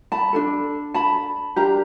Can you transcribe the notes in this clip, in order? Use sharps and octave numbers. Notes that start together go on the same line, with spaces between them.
A5 B5
D4 F#4 A4
A5 B5
D4 G4 A#4 A#5